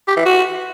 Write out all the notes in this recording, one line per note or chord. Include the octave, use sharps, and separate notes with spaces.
G4
E3
F#4